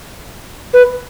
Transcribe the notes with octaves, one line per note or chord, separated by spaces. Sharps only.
B4